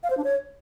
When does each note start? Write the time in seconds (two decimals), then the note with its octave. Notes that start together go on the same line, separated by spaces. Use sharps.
0.03 F5
0.10 C5
0.17 D4
0.24 C#5